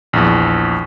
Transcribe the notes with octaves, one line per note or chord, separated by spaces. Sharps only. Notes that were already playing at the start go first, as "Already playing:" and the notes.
A#1 E2